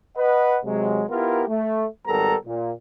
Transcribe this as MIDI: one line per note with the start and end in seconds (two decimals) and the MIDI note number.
0.16 0.58 71
0.16 0.58 75
0.16 0.58 78
0.64 1.03 48
0.64 1.03 54
0.64 1.03 56
1.10 1.43 59
1.10 1.43 64
1.10 1.43 65
1.10 1.43 67
1.10 1.43 70
1.48 1.85 57
2.07 2.35 32
2.07 2.35 55
2.07 2.35 59
2.07 2.35 69
2.07 2.35 70
2.07 2.35 82
2.46 2.72 46